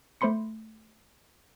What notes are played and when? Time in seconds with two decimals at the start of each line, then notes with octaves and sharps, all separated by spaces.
0.21 A3 C5 B5 C6 C#7